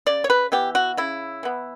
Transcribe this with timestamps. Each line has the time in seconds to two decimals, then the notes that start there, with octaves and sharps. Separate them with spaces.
0.07 C#3 D5
0.24 C#5
0.30 B4
0.52 E3 B3 G4
0.75 F#4
0.97 C#3 E4
1.43 E3 B3